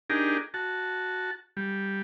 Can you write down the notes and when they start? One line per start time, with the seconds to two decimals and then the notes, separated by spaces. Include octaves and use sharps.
0.10 D4 D#4 G4 G#4 A#4
0.54 F#4 A5
1.57 G3